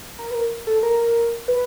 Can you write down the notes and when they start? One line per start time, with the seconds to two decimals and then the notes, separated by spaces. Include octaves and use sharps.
0.19 A#4
0.31 B4
0.35 A#4
0.67 A4
0.83 A#4
1.48 B4